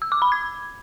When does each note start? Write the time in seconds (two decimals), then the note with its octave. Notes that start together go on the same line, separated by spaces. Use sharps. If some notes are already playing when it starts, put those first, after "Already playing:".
0.02 E6
0.12 D6
0.22 B5
0.32 G#6